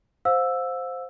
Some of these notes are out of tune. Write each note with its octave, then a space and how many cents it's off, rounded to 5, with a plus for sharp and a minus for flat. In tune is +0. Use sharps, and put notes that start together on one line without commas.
C5 +0 F5 +35 E6 +0